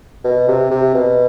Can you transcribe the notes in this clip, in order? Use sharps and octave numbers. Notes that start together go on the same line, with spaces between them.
B2
C3
C3
B2